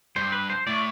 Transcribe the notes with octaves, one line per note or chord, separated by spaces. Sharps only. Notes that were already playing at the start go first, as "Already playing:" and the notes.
G2 C5
B4
C5
A2 D5